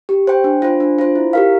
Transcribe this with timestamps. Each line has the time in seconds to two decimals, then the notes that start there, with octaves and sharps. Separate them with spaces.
0.09 G4
0.27 C5 G5
0.44 D4
0.62 F4 C5
0.80 D4
0.99 F4 C5
1.15 E4
1.33 G4 A#4 F5